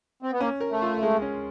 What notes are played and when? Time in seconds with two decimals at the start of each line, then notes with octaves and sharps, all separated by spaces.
0.22 C4
0.32 B3
0.40 A#3 C#4
0.61 A#4
0.71 A3
0.82 F4
1.03 G#3
1.22 C#4